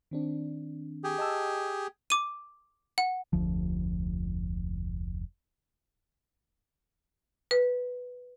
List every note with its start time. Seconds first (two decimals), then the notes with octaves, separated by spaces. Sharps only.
0.11 D#3 C4 D4
1.04 G4 G#4
1.18 D#5 A5 E6
2.10 D6 D#7
2.98 F#5
3.33 F1 D2 F3
7.51 B4